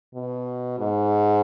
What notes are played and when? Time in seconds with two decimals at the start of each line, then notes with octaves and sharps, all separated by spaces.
0.15 B2
0.79 G#2